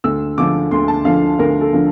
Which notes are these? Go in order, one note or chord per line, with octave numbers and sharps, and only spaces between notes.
D2 E6
D3 F3 D6
D2 C6
A5
D3 F3 F5
D2 A#4
A4
D3 F3